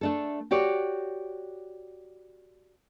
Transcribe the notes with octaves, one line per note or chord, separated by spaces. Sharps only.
A3 D4 A4
F#4 G4 C#5 D5